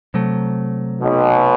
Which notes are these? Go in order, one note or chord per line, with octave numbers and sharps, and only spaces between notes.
C3 F#3 A3
B1 B2